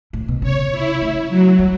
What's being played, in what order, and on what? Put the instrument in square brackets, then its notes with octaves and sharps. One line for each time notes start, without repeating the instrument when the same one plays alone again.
[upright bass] A2
B2
[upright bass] C#3 [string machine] C#5
[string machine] E4
[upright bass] A3
[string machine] F#3
[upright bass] G3